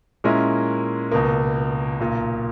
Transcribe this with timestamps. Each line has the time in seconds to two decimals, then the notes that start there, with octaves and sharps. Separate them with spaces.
0.24 A#2 G#3 C#4 E4 A#4
1.12 C#2 B2 A#3
2.00 B1 A#2 A#3